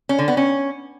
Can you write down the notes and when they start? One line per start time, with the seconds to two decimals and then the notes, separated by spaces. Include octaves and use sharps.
0.09 C#4
0.19 D3
0.28 B3
0.37 C#4